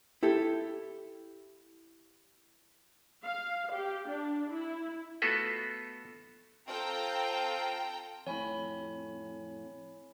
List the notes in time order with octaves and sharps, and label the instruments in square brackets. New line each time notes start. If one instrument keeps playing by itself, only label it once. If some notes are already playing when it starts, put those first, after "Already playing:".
[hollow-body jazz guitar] E4 G4 A4
[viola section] F5
G4
D4
E4
[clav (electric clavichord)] A3 B3 F4 F#4 A4 B4
[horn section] C4 F4 [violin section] A4 G5 A#5
[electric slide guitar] F2 A2 [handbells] C#5 G#5 B5